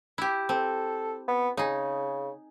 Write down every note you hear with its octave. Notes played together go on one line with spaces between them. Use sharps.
E4 G4
C4 A4
B3
C#3 D#4 G#4